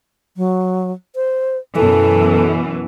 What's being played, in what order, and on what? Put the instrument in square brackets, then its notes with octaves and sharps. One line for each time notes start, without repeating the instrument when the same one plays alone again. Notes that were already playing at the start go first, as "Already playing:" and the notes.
[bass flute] F#3
C5
[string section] F#2 B2 E3 [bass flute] A4